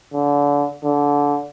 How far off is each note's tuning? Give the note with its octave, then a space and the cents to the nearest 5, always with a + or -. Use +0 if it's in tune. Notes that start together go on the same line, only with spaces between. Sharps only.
D3 -30
D3 -20